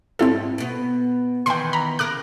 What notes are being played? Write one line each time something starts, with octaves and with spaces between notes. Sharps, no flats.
G#2 G3 C4 E4 A4
B2 B3
D#3 E3 B3 G5 C6
A#5 B5
C#3 A#4 D6 F#6